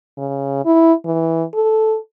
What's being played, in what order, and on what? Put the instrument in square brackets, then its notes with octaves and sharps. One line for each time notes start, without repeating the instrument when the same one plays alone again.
[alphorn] C#3
E4
E3
A4